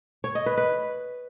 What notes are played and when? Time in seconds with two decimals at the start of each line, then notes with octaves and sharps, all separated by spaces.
0.24 C#5
0.35 D#5
0.46 B4
0.57 B4